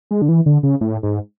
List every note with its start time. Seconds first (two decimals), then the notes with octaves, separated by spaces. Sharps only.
0.11 G#3
0.22 D3
0.29 E3
0.46 D3
0.63 C#3
0.81 A2
1.03 G#2